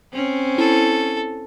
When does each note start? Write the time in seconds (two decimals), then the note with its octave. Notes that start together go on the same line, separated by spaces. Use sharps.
0.13 C4 C#4
0.58 E4 A4